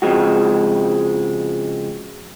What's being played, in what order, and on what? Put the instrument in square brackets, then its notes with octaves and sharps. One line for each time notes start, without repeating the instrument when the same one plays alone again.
[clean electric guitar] C#2 C3 E3 F3 G#3 F#4